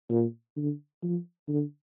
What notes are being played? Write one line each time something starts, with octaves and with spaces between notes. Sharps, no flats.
A#2
D3
F3
D3